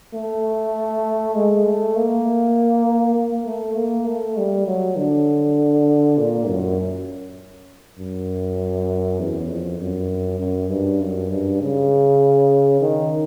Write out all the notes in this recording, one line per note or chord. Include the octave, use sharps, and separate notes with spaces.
A3
G#3
A3
A#3
A#3
A3
A#3
A3
G3
F#3
D3
A#2
F#2
F#2
E2
F2
F#2
F#2
G2
F#2
G2
C#3
D#3